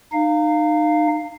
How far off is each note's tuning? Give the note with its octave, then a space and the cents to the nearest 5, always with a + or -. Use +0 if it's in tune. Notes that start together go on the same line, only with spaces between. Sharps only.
D#4 -30 F5 +0